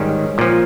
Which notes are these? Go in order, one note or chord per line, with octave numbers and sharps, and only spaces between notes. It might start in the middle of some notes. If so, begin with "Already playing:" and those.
Already playing: G#2 D#3 G3 C#4
A#2 F3